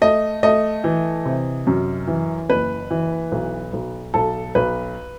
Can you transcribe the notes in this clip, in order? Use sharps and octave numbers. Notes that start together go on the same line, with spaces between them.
A3 D#5
A3 D#5
E3
C3
F#2
E3
F#1 B4
E3
B1
B1
B1 A4
B1 B4